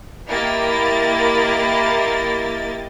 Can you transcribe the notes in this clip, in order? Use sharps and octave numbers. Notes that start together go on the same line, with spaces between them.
A#3 E4 G4 A#4 D#5 A6